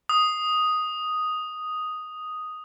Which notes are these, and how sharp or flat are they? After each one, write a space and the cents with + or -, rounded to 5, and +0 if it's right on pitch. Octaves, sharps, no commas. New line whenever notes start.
D#6 +0